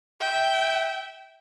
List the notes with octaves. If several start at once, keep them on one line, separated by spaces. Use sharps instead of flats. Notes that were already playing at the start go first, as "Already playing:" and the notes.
E5 G5